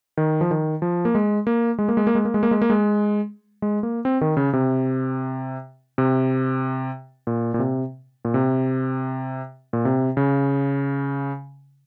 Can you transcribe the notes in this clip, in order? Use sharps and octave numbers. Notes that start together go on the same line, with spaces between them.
D#3
F3
D#3
F3
A#3
G#3
A#3
G#3
A#3
G#3
A#3
G#3
A#3
G#3
A#3
G#3
A#3
G#3
G#3
A#3
C4
D#3
C#3
C3
C3
A#2
A#2
C3
A#2
C3
A#2
C3
C#3